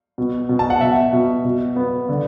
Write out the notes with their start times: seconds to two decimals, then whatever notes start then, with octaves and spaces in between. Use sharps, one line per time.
0.18 B2
0.49 B2
0.59 A5
0.70 F#5
0.81 B2 E5
1.13 B2
1.45 B2
1.76 B3
2.09 D3